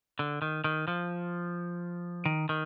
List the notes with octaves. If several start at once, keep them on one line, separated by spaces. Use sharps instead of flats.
D3
D#3
D#3
F3
D#3
D#3